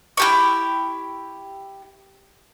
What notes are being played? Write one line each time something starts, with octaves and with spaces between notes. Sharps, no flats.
E4 G4 C#6